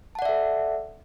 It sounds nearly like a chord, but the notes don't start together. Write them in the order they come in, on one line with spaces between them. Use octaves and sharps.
A5 F#5 D5 E5 A4